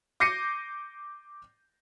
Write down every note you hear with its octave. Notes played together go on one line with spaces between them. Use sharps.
D6 G6 A#6 C7 C#7 D#7